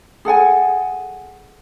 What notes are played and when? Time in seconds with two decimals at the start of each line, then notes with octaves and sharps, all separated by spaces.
0.25 G#4 A4 F#5 G#5